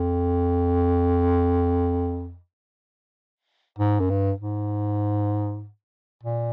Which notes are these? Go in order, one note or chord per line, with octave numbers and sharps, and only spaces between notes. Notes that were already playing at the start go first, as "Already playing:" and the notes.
Already playing: F2
G#2
F#2
G2
G#2
A#2